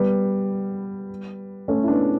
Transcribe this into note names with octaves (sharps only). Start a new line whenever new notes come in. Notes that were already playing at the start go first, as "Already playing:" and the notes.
Already playing: G3 B3
A3 C#4
E4
B3 D4